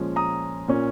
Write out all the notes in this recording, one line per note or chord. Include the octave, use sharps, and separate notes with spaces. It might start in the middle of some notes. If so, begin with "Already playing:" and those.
Already playing: A#2 F3 G#3 C#4
A#5 D#6
A#2 A#3 C#4